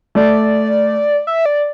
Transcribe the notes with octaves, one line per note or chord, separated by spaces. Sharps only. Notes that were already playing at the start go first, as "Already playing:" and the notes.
A3 D5
E5
D5